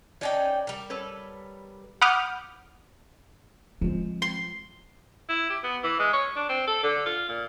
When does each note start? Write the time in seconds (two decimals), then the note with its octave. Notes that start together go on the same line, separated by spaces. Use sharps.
0.21 C#4 D#4 C#5 D5 G5 G#5
0.67 G3 A#4
0.90 A4 B4 C#5
2.01 F#5 B5 D6 D#6 F6 G6
3.81 F3 G#3 C4
4.22 C6
5.29 E4
5.50 G4
5.63 B3
5.83 E3
5.99 G#3
6.13 C#5
6.36 D4
6.49 C4
6.67 A4
6.83 D3
7.06 F4
7.29 A#2